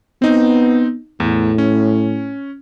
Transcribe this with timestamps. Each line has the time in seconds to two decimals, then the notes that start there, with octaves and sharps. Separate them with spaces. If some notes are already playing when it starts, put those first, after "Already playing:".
0.22 B3 C4 D#4
1.20 E2 A2
1.58 C#4